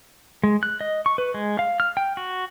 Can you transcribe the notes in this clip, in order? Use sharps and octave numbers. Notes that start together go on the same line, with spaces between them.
G#3
F#6
D#5
C#6
B4
G#3
F5
F6
G5
F#4